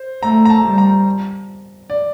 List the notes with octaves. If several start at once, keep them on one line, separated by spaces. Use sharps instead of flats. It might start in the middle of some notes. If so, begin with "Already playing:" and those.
Already playing: C5
A3 A#5
A#5
A5
G3
A#5
D5